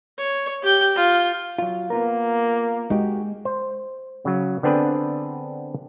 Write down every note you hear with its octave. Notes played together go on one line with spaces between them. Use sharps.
C#5
G4 G5
F4
F#3 F4
A#3 B3 F4 A#4
G#3 D#4 F#4 G4
C5
C#3 F#3
D3 B3 C4 D4 G#4 B4